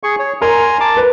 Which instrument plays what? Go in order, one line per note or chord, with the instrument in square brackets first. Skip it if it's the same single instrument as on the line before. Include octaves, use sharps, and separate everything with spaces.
[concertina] G#4 C#6
C#5
[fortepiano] A#4 [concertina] G#5 A#5 C6
[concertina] A5 D6
[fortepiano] B4